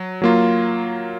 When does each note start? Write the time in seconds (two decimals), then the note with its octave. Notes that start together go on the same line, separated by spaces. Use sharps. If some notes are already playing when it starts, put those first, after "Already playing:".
Already playing: F#3
0.22 F#3 A#3 F4